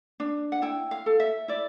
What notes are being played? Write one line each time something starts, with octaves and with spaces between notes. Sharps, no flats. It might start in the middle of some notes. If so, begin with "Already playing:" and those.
D4
F#5
E4 G5
F5
A4
E5
E4 D5